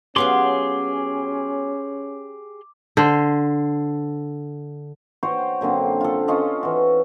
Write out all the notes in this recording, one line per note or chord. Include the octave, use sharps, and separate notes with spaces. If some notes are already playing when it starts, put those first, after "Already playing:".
F#3 B3 C#4 F4 G4 G#4 C6 D6
D3 C5
F#4 C5 C#5 G5
F#2 D3 A#3 C4
F4 A4
C#4 F4 A4 D#5
E3 F#4